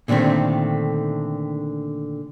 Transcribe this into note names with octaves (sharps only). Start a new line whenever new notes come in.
A#2 D3 D#3 A3 C4